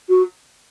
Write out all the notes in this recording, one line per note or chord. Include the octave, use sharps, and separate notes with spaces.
F#4